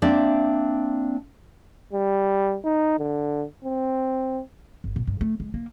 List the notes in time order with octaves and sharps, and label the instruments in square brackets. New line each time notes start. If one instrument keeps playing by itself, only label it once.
[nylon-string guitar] A#3 C4 D4 D5 E5
[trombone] G3
D#4
D3
C4
[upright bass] G1
A#2
G2
A3
G#3
A#3